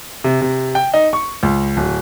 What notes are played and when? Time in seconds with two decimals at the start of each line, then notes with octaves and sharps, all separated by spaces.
0.24 C3
0.42 C3
0.75 G5
0.94 D#4
1.13 C#6
1.43 C#2
1.77 D1